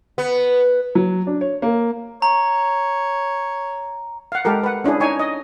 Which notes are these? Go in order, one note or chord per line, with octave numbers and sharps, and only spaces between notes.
B3
F#3
D4
C#5
A#3
C#5 A#5
F5 F#5
G#3 G4 A4 A#4
B4 F#5
C#4 D4 E4 G#4
D#4 C#5 G#5
D#5